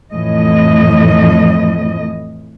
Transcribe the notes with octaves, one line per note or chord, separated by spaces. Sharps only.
F2 A2 E3 D#5